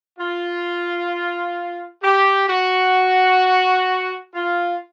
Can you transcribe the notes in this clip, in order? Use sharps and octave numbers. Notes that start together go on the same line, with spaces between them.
F4
G4
F#4
F4